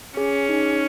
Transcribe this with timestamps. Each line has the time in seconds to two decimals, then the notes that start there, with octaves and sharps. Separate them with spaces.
0.17 C#4 G#4
0.49 D#4